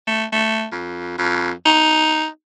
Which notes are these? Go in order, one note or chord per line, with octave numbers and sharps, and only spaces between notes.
A3
A3
F2
F2
D#4